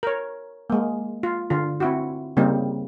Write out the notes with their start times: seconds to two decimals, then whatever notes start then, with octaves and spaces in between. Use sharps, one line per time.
0.03 A#4 C#5
0.70 G#3 A#3
1.23 F4
1.50 D3 F4
1.80 C4 E4 F#4
2.37 C#3 G3 A#3 C4 D#4